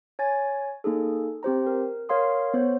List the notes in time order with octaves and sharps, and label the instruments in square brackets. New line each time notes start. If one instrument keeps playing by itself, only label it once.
[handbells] C#5 G#5 A6
A#3 D#4 G#4 A4
C4 G4 C5 A#5
A#4
A#4 C#5 F5 C6 D#6
B3 C5 C#5 G6